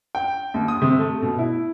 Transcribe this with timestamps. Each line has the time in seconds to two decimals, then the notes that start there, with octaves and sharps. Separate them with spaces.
0.15 G5
0.54 D#2
0.68 D#6
0.82 C3
0.99 A3
1.22 B2
1.39 E4